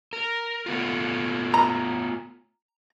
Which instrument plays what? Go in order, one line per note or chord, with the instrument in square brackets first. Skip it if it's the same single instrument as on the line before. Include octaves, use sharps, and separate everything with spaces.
[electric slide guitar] A#4
A3 B3 F4
[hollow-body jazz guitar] A#5